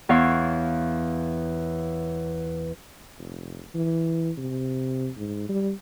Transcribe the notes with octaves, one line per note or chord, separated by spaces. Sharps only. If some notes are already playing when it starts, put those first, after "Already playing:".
E2 E3 C#5 F5
F1
E3
C3
G#2
G3